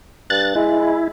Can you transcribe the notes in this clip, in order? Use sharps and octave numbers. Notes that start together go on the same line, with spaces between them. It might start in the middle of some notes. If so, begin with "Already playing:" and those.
G2 F#6 A6
G#3 E4